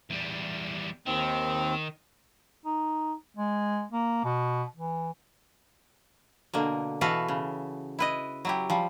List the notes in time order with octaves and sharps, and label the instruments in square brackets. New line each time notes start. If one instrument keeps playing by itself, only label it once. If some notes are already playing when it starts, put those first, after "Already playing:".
[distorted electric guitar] E2 G3
[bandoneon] D#2 C4 [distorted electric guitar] D#3
[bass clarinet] D#4
G#3
A#3
B2
E3
[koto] B2 D3 A#3
B2 E3 F#4 A4 B4 F5
C#3
E4 B4 D#5
F#3 E4 G4
F3 G3